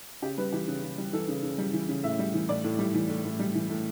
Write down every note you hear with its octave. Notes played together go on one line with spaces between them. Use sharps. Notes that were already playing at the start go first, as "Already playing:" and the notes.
C#3 G4
G3 B4
E3 G4
C#3
C#3
G3
E3 A4
C#3
C#3
G3
E3
C#3
A2 E5
G3
E3
A2 D5
A2
G3
E3
A2
A2
G3
E3
A2